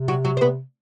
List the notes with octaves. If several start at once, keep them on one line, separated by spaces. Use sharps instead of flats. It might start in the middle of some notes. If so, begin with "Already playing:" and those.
Already playing: C3
F#3 F#4
F#3 F#4
C5
B3 B4